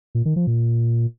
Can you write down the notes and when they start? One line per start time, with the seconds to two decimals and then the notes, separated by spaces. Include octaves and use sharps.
0.15 A#2
0.25 D#3
0.36 F3
0.47 A#2